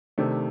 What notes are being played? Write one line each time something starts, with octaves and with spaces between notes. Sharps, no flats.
C3 D#3 A3 D4